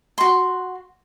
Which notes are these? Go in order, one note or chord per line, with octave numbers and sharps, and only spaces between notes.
F#4 C6